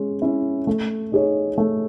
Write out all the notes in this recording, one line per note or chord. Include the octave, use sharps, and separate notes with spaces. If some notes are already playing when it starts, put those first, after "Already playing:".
Already playing: G#3 C#4
C#4 E4
A3
D#4 G#4 C#5
A3